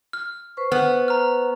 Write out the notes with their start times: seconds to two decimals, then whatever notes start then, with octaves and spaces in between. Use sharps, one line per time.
0.13 F6
0.57 B4 C5 C#6
0.72 B3 F6
1.08 A#5 F6